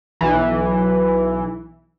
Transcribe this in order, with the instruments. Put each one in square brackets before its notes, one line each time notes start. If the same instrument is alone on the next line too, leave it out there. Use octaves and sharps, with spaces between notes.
[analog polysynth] B1 E3